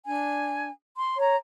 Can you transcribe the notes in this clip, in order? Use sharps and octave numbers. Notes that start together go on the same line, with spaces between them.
D4 G#5
C6
C#5 A#5